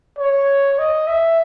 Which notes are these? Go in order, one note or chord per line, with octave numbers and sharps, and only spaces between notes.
C#5
D#5
E5